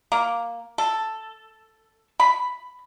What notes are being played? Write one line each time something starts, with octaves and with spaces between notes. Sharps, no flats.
A#3
A4
B5